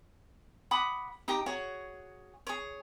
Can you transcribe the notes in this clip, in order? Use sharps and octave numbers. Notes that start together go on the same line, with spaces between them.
F#5 B5 D6 D#6
D#4 G4 A#5
F#4 G#4 C#5
G#4 C#5